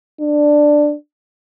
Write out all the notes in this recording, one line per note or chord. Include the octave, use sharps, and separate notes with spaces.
D4